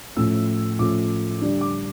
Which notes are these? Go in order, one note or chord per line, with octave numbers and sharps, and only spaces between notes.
A2 F3 A3 C#4 E6
A2 F3 A3 C#4 D6
D3 G3 D4
D6